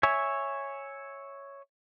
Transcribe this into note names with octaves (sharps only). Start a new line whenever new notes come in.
C#5 E5 G#5